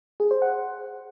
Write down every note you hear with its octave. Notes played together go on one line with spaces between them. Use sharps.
G#4
C5
F#5